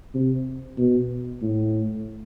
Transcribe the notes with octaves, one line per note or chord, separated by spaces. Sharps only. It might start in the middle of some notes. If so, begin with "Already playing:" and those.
C3
B2
A2